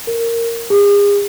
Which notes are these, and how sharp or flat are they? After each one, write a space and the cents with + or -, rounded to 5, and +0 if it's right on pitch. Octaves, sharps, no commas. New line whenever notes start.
A#4 -10
G#4 -40